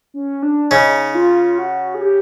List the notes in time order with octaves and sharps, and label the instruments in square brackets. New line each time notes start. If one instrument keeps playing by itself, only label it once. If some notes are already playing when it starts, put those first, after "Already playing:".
[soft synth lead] C#4
D4
[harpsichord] C#3 C#4 [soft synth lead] D#4
[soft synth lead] F4
F#4
G#4
G4